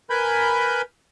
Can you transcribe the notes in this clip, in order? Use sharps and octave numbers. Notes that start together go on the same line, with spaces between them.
A#4 B4 G#5 B5 G6